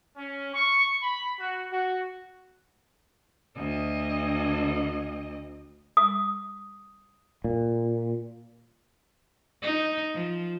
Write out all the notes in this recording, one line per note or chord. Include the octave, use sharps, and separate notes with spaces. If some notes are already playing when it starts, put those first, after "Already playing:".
C#4
C#6
B5
F#4
F#4
D2 D#5
D#6
A#2
D#4
F3